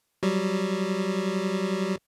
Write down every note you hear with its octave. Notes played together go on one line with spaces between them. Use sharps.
F#3 G3